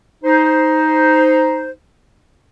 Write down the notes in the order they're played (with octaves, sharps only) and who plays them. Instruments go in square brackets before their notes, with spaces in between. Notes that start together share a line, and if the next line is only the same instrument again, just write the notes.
[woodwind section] D#4 C5